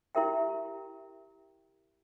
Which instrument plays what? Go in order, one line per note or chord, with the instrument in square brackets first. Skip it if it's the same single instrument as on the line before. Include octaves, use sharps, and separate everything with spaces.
[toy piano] E4 G4 A#4 E5 G5